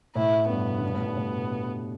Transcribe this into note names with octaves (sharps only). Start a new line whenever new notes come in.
A2 E4
G2 B2 B3
D3
G2 B2
A2
G2 B2
A2